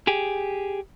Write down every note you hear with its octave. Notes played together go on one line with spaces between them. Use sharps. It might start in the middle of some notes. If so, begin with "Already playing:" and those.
G4 G#4